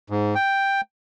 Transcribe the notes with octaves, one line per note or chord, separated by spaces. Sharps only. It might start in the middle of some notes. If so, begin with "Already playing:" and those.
G#2
G5